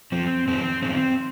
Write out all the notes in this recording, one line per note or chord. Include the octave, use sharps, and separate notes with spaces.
F2 F3 C4
F2 D#3 C4
F2 D#3 C4